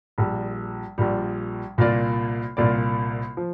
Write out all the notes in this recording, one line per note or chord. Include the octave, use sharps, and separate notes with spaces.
A#1 A#2 G3
A#1 A#2 G3
C2 A#2 A#3 F4 D5
C2 A#2 A#3 F4 D5
F3